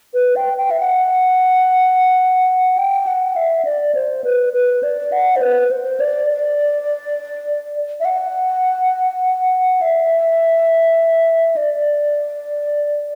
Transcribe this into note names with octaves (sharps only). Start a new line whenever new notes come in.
B4
G5
G5
E5
F#5
G5
F#5
E5
D5
C5
B4
B4
D5
F#5
C5
B4
C5
D5
D5
E5
F#5
E5
D5